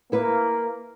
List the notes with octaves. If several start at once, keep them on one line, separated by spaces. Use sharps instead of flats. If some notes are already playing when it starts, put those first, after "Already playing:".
A#3 E4 B4